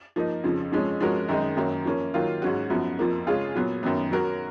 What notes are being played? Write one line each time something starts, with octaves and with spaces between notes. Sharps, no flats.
F3 A#3 D#4
F2 C#3 F3
F2 F3 G#3 C#4
F3 G#3 C#4 F#4 A#4
F#2 D#3 G#3 D#4
F#2 D#3 F#3 A#3
F3 A#3 C#4
D#3 F#3 A#3 F4
G#2 F#3 C#4 F#4
F#2 F3 B3 F#4
F2 F3 A#3
C#3 G#3 C#4 F4 G#4
A#2 F#3 B3
F#2 D#3 F#3 B3
F#3 C#4 F#4 A#4